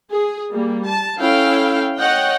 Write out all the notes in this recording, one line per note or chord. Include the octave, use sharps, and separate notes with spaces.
G#4
G3 A#3
A5
C#4 E4 A4 F5 G5
C#5 D#5 F#5 G5